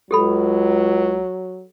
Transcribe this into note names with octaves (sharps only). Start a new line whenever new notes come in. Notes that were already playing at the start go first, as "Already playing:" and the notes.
C#2 F#3 G4 A4 B5